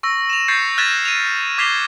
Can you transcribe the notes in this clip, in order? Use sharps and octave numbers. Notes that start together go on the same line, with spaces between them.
C#6 E6 A#6
E7 F7
C#6 G6 A6 C7 C#7
F6 F#6 G#6 A6 B6 E7
D#7 F7
D6 G#6 B6 C7 F7 G7